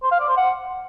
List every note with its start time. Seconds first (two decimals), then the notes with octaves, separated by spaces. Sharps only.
0.03 C5
0.11 F5
0.20 D5
0.28 C5
0.37 F#5